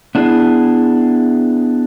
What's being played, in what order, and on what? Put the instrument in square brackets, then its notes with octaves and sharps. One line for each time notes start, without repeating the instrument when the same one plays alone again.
[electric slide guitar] B3 D4 E4 G#4